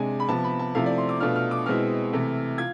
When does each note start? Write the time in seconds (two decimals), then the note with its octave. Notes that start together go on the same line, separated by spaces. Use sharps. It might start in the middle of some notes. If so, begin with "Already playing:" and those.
Already playing: C3 G#3 D4 G#5
0.20 B5
0.29 C3 F3 B3 A5
0.44 B5
0.59 A5
0.75 C3 F3 A3 E4 F5
0.86 D5
0.98 C6
1.09 D6
1.20 B2 A3 D4 F4 F6
1.36 F6
1.51 D6
1.66 B2 G#3 C4 E4 F6
2.12 C3 E3 A3 E4
2.58 F4 G#6